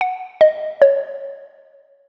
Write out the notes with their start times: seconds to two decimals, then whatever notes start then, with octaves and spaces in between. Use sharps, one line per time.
0.01 F#5
0.41 D#5
0.82 C#5